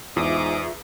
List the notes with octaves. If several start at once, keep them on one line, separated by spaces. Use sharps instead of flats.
E2 G#2 F4 G#4 E5 D6 D#6